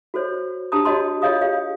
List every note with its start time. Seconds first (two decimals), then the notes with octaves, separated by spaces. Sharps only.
0.14 F#4 A4 C5 C#5
0.72 D4 G4 A5 A#5 D#6
0.85 F#4 G4 C#5 D#5 A5 C6
1.22 F4 G#4 C#5 D#5 F5 D#6
1.41 G4 G#4 C#5 F5